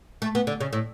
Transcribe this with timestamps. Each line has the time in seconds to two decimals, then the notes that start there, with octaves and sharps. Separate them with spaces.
0.22 A3
0.35 B3
0.47 D3
0.60 C#3
0.73 A2